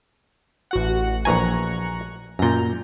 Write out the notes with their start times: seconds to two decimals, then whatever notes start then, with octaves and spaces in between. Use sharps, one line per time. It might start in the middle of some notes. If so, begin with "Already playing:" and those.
0.71 A1 F#4 F#5
1.25 A#1 E3 G#5 A#5 C#6 F#6
2.39 F#2 A#2 A#5 G6